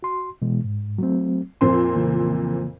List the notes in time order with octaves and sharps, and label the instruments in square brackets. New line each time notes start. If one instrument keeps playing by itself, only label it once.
[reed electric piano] F#4 C6
B2 E3 G#3
G#2
F#3 A3 C4
[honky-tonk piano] F2 A#2 C4 [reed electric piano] C6
[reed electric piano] C#3 E3 A#3